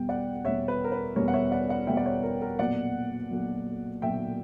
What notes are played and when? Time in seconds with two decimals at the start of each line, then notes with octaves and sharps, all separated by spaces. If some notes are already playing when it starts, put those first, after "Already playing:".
Already playing: E2 B2 G3 G5
0.09 D5 F#5
0.44 E2 B2 G3 C#5 E5
0.68 B4
0.84 A#4
0.92 B4
1.16 E2 B2 G3 A#4 C#5
1.28 F#5
1.34 C#5 E5
1.52 D5 F#5
1.69 D5 F#5
1.87 E2 B2 G3 E5 G5
1.97 D5
2.06 C#5 E5
2.23 A#4
2.42 A#4
2.59 B1 A#2 F#3 D5 F#5
3.31 B1 A#2 F#3
4.02 B1 A#2 F#3 E5 G5